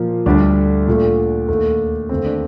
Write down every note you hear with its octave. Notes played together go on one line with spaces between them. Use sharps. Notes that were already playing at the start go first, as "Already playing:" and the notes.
Already playing: A#2 F3 A#3
D2 D3 G3 D4
A#2 A3
D#2 D#3 A3
D#2 D3 A3 C4
D4